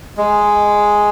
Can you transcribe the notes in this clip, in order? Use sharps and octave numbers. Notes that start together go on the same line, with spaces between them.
G#3